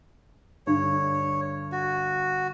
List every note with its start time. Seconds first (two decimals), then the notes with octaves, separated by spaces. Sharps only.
0.67 G2 D3 C#5
1.72 F#4